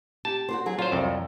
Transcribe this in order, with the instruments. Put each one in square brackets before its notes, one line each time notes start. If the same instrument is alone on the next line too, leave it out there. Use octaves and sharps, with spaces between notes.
[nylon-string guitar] G4 [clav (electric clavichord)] A5
[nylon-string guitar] F#4 G4 C5
F#3 G#4
[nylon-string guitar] F#3 [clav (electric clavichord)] F4 C5
[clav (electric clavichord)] C2 F2